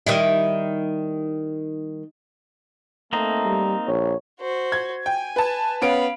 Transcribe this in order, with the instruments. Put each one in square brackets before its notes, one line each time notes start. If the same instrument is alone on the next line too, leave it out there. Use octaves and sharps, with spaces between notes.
[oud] D#3 G3 E4
[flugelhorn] A3 [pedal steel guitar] A#3 C4 D#4 [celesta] A#5
[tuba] G3
[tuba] A#1 [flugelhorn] C#5
[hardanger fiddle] F#4 C5
[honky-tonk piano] G#6
[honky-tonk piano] G5 [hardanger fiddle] G#5
[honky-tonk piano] B4 A5
[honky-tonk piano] B3 C#4 D7 [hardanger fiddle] F5 B5